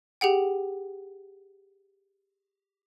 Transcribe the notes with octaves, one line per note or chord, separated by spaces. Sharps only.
G4 G#4 F#5 G5